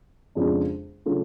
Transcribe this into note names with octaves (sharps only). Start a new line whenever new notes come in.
F2 C#3 G#3 D4 F4
C#3 F#3 A3 F4